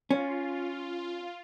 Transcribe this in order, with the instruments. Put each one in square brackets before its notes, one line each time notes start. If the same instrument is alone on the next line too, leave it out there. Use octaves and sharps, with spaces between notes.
[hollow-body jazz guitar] C#4 [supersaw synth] F4